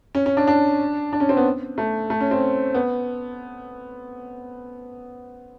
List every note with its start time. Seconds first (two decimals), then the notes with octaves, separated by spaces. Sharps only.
0.15 C#4
0.26 C#4
0.37 D4
0.47 D4
1.13 D4
1.20 C#4
1.29 C4
1.37 B3
1.78 A3
2.10 A3
2.21 C#4
2.31 C4
2.74 B3